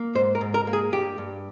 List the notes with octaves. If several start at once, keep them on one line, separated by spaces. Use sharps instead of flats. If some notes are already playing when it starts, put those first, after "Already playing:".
Already playing: A#3
G#2 C5
A#4
G#2
A#4
A#3
G#4
G2 G4
G2